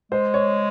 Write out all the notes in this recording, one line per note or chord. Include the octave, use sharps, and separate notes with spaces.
G#3 C5
C#5